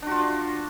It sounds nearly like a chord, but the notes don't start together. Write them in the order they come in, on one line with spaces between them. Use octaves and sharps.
D4 F#4 F4